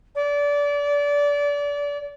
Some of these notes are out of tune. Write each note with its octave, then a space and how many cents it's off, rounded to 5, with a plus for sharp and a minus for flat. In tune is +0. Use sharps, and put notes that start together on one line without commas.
D5 -25